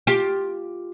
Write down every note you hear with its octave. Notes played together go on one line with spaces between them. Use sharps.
F4 G4